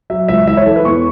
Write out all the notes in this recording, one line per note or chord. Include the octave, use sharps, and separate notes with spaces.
F#3 E5
C#2 E5
E3 E5
C#5
E3 A4
B4
E2 C#6